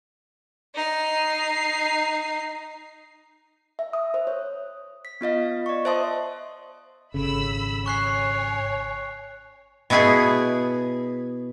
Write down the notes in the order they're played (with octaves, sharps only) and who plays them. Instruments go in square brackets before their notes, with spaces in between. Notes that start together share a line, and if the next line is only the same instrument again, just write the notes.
[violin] D#4 C7
[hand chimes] E5
D#6
C5
C#5
B6
B3 F4 D#5 F5
D5 C#6
C5 D#5 E5 A5 C6 D#6
[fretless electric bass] G#1 C#3 [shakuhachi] A4 [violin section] B5 E6
[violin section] C#5 [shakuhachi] G#5 [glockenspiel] C#6 F#6 C7
[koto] B2 B3 E4 G#4 G#5